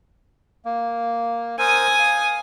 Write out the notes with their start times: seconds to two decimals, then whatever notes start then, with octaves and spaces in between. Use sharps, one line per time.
0.65 A#3
1.59 A#4 C5 G#5 D#6 E6
1.99 F5